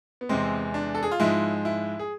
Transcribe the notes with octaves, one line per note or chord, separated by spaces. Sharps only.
B3
E2 C3 G#3 C4
D4
A4
G#4
F4
G#2 F3 G#3 E4
E4
G#4